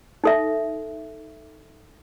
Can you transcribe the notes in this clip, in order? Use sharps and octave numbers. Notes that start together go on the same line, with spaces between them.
D#4 A4 E5